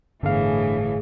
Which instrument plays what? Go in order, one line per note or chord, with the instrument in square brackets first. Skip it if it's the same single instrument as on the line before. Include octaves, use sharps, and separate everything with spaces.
[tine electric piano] G1 F5 [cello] A2 E3 [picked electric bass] D3 [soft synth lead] G#4